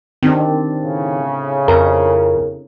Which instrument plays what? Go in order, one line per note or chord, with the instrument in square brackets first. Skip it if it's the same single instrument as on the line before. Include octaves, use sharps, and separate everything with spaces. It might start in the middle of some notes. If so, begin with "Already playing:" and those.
[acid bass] D#3 [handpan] C4 D4
[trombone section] A2 C#3
[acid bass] F2 [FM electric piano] A#4